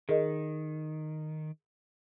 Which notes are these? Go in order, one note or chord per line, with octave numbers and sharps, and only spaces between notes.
D#3 G#4 A#4 D#5